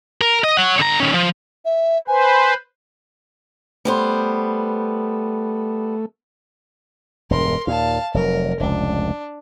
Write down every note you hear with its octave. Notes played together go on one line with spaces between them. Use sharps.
A#4
D#5
C#5 F#5
D3 A#5
D#3 C#4
F3
E5
B4 C5 G#5
G3 A3 B3 C5
E1 G2 A#4 C6
D#2 A#2 F5 A5
F1 G#2 F#3 A#4
F1 C#2 D4